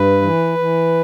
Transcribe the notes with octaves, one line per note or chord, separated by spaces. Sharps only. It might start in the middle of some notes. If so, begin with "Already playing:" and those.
Already playing: G2 B4
E3
E3